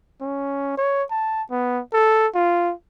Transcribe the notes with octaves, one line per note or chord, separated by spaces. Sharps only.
C#4
C#5
A5
B3
A4
F4